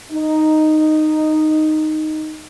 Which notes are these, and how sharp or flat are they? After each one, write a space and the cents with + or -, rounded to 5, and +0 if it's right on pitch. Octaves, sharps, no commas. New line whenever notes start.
D#4 -5